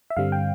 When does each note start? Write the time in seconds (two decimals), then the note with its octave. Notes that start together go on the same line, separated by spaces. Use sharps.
0.10 E5
0.17 G2 D3 G3 C4 F5
0.32 G5